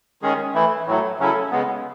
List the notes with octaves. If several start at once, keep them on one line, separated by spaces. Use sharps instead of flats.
D#3 G#3 C#4 G#4
E3 A3 E4
A2 F#3 A3
C#3 F#3 C#4 E4 A4
C#3 G#3 B3